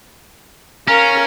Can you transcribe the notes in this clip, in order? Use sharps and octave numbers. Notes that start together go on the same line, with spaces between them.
C#4 A#4 F5